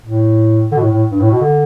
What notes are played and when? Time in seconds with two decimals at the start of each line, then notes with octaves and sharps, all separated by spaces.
0.02 A2
0.72 D3
0.77 B2
0.81 A2
0.92 A2
1.11 G2
1.21 A2
1.31 B2
1.41 D3